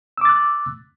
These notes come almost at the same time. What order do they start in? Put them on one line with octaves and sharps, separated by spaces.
E6 D6 A6 F#6